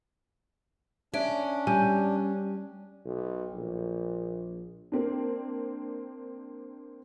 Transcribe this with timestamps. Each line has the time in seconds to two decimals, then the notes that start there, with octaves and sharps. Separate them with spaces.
1.14 C#4 D4 C#5 E5 D7
1.67 G3 G#5
3.05 B1
3.54 A#1
4.92 A#3 C4 D4